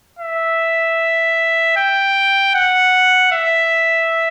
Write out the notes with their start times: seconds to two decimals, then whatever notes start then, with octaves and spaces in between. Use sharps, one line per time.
0.19 E5
1.77 G5
2.55 F#5
3.32 E5